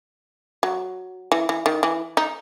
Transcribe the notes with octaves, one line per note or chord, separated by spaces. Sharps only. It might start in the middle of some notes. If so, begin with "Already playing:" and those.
F#3
E3
E3
D#3
E3
D#4